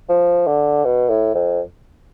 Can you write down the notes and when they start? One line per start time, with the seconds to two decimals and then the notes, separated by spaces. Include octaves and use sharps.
0.09 F3
0.47 D3
0.85 B2
1.10 A2
1.34 F2